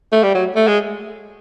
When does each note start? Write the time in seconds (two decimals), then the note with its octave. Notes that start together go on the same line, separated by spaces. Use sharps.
0.12 A3
0.23 G3
0.35 F#3
0.56 A3
0.68 G#3